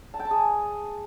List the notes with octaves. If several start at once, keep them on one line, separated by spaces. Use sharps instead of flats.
A5
G5
A5
G#4